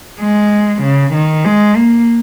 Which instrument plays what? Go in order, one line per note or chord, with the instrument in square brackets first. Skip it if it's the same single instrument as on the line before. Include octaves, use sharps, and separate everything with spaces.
[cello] G#3
C#3
D#3
G#3
A#3